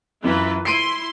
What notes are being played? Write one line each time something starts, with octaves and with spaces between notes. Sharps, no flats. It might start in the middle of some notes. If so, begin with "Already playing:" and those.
F#2 E3 F4 B4
E4 C6 C7 D7 D#7